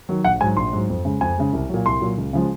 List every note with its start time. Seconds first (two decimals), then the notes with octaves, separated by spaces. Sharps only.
0.09 D#3 F#3
0.24 A#1 F#5
0.40 G#2 F#3 G#5
0.57 A#1 C6
0.73 G#2 F#3
0.89 F2
1.05 C#3 G#3
1.21 F2 G#5
1.37 C#3 G#3
1.53 C2
1.69 A#2 F#3
1.86 C2 C6
2.01 A#2 F#3
2.18 C#2
2.33 C#3 F3 G#3